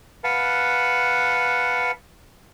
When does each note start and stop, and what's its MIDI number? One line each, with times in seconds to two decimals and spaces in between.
0.24 1.91 71
0.24 1.91 77
0.24 1.91 78
0.24 1.91 81